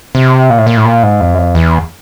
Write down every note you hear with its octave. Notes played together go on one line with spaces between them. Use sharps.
C3
A#2
A2
A#2
A2
A#2
G#2
F2
F#2
F2
E2